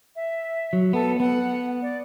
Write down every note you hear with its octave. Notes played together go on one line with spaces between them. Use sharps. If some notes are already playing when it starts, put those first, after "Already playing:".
E5
F#3
B3 A4
B3 F#5
D5